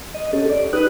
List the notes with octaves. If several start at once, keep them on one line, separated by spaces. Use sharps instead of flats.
D#5
C#4 G4 A4
D5
D#4 G4 B4 D#6 F#6